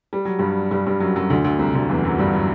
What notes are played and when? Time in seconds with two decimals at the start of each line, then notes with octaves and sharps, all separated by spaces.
0.13 G3
0.25 F#3
0.39 G2 G3
0.71 G2 G3
0.86 G2 G3
1.00 F#2 F#3
1.15 F#2 F#3
1.30 D2 D3
1.44 D2 D3
1.59 C2 C3
1.74 D2 D3
1.83 F#3
1.89 E2 E3
2.04 F#2 F#3
2.19 G2 G3
2.33 F#3